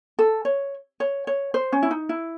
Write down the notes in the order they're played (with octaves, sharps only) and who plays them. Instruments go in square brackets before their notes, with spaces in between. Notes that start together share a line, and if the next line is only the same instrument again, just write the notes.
[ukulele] A4
C#5
C#5
C#5
C5
C#4
E4
D#4
E4